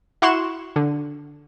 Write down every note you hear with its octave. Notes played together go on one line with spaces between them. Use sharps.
E4 F#4 C6 C#6 F#6 E7
D3